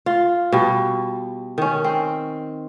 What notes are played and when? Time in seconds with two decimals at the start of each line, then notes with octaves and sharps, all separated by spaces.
0.06 F4
0.52 B2 G3
1.58 D#3 C#4
1.84 C4